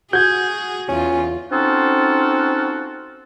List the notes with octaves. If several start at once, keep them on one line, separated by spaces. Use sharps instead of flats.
F#4 G#4 G6 G#6
E2 C#4 F4
C4 C#4 D#4 F4 F#4 A4